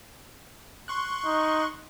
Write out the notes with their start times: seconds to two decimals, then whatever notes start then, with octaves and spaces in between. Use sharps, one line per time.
0.88 C6 C#6 F#6
1.25 D#4